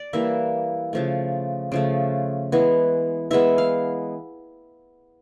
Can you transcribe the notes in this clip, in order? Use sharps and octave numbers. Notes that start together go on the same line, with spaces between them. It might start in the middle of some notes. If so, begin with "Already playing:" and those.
Already playing: D5
E3 G3 A#3 E5
C#3 F3 A3
C#3 F3 A3
E3 G#3 B3
E3 G#3 B3 E5
F5